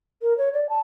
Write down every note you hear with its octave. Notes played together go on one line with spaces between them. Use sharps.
A#4
C#5
D5
A5